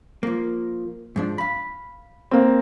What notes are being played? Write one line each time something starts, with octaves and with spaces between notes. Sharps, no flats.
F3 A#3
G#2 F3 D4
F5 B5
A#3 C4